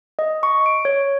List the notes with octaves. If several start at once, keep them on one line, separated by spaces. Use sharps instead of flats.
D#5
C#6
D7
C#5